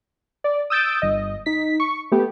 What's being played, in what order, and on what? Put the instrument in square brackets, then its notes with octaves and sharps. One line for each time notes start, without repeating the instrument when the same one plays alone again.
[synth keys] D5
D#6 E6 G6 A6 D7
G1 D#5
D#4 B6
C#6
A3 B3 G4